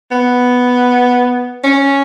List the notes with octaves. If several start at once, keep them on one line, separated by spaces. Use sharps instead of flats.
B3
C#4